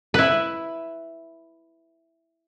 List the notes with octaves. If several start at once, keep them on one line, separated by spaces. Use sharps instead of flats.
E4 B4